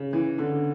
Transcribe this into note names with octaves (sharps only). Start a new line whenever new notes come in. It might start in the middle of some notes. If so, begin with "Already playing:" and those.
Already playing: C#3
E3
D3